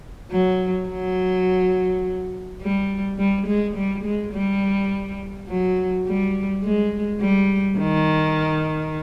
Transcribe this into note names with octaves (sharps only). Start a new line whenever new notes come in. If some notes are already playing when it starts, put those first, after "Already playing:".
F#3
F#3
G3
G3
G#3
G3
G#3
G3
F#3
G3
G#3
G3
D#3